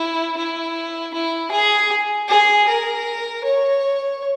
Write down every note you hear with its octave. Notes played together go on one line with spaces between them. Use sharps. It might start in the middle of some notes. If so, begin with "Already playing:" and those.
Already playing: E4
E4
E4
G#4
G#4
A#4
C#5